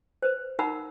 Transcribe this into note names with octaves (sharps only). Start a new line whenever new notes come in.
B4 C5
D#4 A#4 F#5 A#5 B5 E6